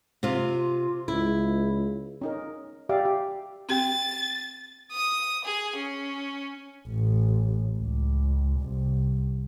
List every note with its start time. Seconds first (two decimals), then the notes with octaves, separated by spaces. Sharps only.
0.23 C3 F4
1.08 C#2 E4
2.21 C#4 D#4 A#4
2.89 G4 D5 E5 F5 D6
3.05 G4
3.69 C4 G4 G5 A6
4.91 D#6
5.45 G#4
5.77 C#4
6.88 A1
7.79 C#2
8.60 C2